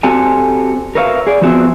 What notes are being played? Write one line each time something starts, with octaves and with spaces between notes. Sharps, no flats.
C4 F#4 G4 A4 D5 G#5
A#4 B4 C#5 E5 F5
G#4 D5
F3 B3 C4 F#4 G#4 E5